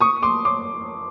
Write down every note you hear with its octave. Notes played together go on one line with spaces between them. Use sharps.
C#6 D#6
C6 D6
C6 D6